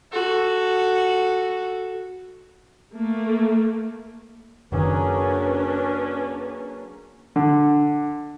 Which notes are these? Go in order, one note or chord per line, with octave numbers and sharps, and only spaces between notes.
F#4 A4
A3 A#3
F#1 D#3 F#3 A#3 C#4 D4 G#4 B4
D3